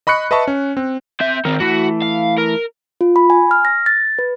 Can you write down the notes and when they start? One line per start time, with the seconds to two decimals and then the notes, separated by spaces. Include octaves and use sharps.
0.07 D#5 B5 C#6 F#6 C#7
0.31 B4 D#5 E5 A5 C#6
0.47 C#4
0.77 C4
1.20 C4 E5 G6
1.45 D#3 C4 A#4
1.60 E3 A3 E4 F#4
2.02 F5
2.38 A#4
3.01 F4
3.16 B5
3.30 G#5
3.51 F6
3.65 A#6
3.86 A6
4.19 B4